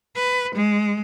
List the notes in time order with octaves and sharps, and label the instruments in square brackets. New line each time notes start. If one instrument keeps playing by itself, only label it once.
[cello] B4
G#3